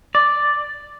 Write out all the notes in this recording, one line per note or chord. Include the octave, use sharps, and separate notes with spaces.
D5